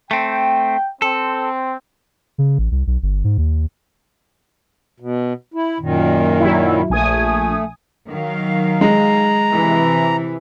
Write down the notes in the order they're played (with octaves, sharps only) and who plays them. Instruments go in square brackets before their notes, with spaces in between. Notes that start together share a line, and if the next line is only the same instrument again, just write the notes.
[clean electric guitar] A3 C4 [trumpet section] G5
[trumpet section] C4 [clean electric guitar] A4
[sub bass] C#3
A1
C2
B1
G1
G#2
D#2
[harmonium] B2
E4
F#2 A#2 D#3
[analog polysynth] F#3 E4
[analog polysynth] A#1 G#5 D#6 [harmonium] A3
[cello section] D#3 F#3 F5
[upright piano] G#3 [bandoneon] A#5
[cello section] C3 E3